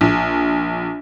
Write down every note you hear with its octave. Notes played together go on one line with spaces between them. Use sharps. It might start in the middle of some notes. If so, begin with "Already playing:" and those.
A#1